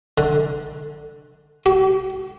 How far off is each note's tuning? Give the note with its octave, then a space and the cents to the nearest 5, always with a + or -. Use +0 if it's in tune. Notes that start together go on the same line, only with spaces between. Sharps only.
D3 +15
G4 -45